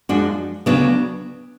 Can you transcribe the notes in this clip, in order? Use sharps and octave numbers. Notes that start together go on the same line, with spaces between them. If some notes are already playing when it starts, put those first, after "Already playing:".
F#2 F3 G#3 D4 F#4
D2 C#3 F#3 B3 D4